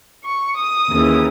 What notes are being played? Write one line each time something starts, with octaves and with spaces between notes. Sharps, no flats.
C#6
D#6
D#2 C#3 E3